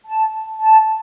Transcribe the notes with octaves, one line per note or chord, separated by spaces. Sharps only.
A5
A5